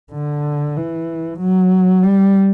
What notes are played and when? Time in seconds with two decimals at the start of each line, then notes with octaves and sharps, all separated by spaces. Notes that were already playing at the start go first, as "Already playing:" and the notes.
0.12 D3
0.76 E3
1.39 F#3
2.03 G3